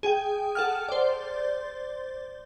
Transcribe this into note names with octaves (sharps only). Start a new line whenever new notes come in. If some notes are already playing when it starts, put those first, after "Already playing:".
G#4 G5
A4 F#5 F6
C5 D5